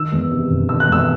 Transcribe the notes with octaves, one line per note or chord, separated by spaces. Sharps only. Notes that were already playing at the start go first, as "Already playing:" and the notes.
Already playing: D#3 E6
E2
C3
E1
D#3 E6
F#6
E2 E6